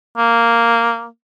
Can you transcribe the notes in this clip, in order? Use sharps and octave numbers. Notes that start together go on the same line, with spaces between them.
A#3